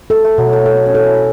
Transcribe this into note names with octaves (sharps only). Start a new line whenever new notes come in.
A3 A4
A3
B2 F#3
A3
A4
C#4
A4
E4